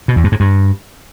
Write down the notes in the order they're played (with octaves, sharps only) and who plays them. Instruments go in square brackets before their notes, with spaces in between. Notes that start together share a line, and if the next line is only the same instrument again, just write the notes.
[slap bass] B2
E2
G2
G#2
G2